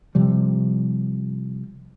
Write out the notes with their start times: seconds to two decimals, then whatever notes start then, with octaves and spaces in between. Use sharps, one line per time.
0.15 C3 F3 G3